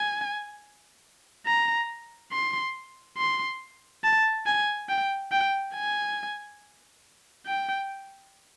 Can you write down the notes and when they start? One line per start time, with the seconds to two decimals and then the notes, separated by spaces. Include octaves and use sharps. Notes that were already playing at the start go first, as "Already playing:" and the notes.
Already playing: G#5
1.46 A#5
2.32 C6
3.18 C6
4.04 A5
4.46 G#5
4.89 G5
5.32 G5
5.75 G#5
7.46 G5